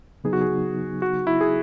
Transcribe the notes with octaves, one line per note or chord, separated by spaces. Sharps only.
C#3 F#3 B3 D#4 G#4
F#4
G#4
F#4
E4
G#4